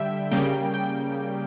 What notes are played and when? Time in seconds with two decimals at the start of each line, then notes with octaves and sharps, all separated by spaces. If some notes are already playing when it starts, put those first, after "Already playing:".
Already playing: D3 G3 E5 G5
0.32 C#3 G3 A#3 G5
0.74 G5